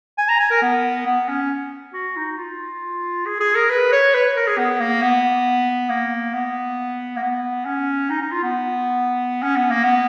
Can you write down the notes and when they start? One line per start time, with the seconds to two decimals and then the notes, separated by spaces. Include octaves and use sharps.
0.18 G#5
0.29 A#5
0.39 G#5
0.50 A#4
0.62 B3
1.06 B3
1.28 C#4
1.93 F#4
2.16 D#4
2.37 F4
3.26 G#4
3.40 G#4
3.55 A#4
3.70 B4
3.92 C#5
4.14 B4
4.36 A#4
4.47 G#4
4.58 B3
4.80 A#3
5.02 B3
5.90 A#3
6.33 B3
7.16 A#3
7.22 B3
7.66 C#4
8.10 D#4
8.22 D#4
8.32 F4
8.43 B3
9.43 C#4
9.56 B3
9.70 A#3
9.84 B3